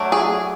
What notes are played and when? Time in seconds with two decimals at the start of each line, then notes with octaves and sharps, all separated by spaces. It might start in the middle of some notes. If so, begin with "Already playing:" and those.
Already playing: F#3 A3 D4
0.12 G#4